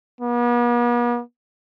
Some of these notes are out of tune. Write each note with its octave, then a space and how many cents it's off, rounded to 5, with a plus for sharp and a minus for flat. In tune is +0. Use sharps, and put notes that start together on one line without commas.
B3 -45